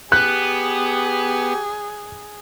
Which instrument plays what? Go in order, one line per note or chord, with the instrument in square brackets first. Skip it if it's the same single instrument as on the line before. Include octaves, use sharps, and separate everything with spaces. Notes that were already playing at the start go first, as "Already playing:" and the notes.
[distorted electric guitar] B3 [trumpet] G4 [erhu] G#4 [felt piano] F#6